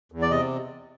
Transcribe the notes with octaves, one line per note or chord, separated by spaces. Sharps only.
E2
D5
C3 D#5